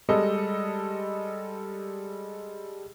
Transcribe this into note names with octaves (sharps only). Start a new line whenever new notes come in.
G3 G#3 A4 D#5